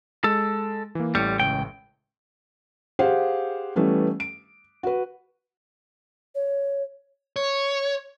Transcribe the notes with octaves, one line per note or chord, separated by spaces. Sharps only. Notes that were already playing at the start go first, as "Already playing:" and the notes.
G#3 A4
E3 A#3
A1 A2 G3 C#7
C#2 G5
G4 G#4 C5 F5 F#5
E3 G3 A3 B3 C#4
D7
F#4 B4
C#5
C#5